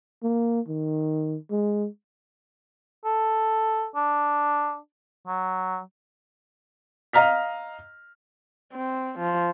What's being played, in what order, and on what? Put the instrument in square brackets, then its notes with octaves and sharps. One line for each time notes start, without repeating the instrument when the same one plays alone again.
[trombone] A#3
D#3
G#3
[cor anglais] A4
D4
F#3
[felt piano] D#5 F5 A#5 F6 B6
[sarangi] C4
F3